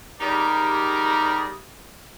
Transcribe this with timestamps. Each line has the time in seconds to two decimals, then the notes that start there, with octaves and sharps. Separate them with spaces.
0.21 G3 D#4 G4 G#4 A#4 D5